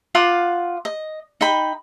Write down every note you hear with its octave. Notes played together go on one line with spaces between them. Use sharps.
F4 F5 F#5 D6
D#5
D#4 G5 B5